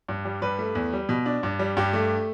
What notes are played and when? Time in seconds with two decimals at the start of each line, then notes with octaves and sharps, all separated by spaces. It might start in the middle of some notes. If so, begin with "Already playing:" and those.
0.09 G2
0.25 G3
0.42 G2 B4
0.59 A3
0.75 E2
0.93 G3
1.09 B2
1.26 D4
1.43 G2
1.59 G3
1.77 G2 G4
1.93 A3